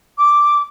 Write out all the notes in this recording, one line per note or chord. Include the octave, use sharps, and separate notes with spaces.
D6